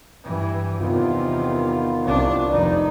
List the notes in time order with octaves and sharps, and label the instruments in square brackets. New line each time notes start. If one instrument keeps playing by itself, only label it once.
[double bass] G2 E3
[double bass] E2 C3 [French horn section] D#3 B3 F4
[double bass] C2 D4
[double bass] F1 D#4 [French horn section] D#3 B4 D5